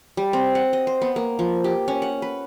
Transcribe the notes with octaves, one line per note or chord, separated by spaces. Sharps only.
G3
C4
F#5
D#5
C5
B3
A#3
F3
G4
C#4
F#5
B4